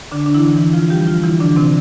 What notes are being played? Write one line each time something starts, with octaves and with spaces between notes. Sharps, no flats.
D3 D4
D4
E3 E4
E3 E4
F3 F4
G3 G4
F3 F4
E3 E4
D3 D4
C3 C4